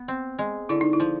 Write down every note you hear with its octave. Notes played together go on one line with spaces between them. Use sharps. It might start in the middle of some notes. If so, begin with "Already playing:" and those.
Already playing: B3
C4
G#3
D3 E4
D#4
E4
F3